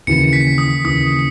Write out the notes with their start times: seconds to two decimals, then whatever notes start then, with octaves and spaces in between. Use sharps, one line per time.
0.07 D#2 C#3 E3 C#7
0.33 B6
0.58 D#6
0.84 D#2 C#3 E3 D#6